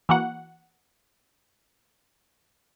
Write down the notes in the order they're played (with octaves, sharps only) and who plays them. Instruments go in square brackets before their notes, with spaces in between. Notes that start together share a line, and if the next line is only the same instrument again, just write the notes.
[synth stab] E3 A#3 F#4 F#5